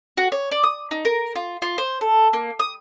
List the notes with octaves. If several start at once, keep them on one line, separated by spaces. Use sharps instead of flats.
F#4
C#5
D5
D#6
D#4
A#4
F4
F4
C5
A4
A#3
D#6